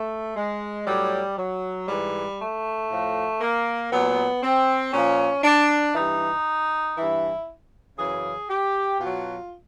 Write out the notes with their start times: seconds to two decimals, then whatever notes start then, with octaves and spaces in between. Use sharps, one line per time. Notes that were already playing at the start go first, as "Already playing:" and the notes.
Already playing: A3
0.36 G#3
0.86 A2 F#3 G3
1.38 F#3
1.87 G#2 E3 G3
2.39 A3
2.89 A2 F3
3.41 A#3
3.91 A#2 F#3 B3
4.43 C4
4.93 A#2 F3 C#4
5.44 D4
5.95 G2 E3 D#4
6.97 G2 E3 E4
7.98 F#2 C#3 E3 G#4
8.50 G4
9.00 B2 F#3 F4